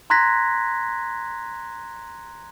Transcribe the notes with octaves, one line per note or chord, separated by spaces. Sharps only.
A#5 C6 F#6 G#6 A#6 B6